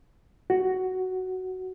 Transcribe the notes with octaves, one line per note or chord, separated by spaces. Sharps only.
F#4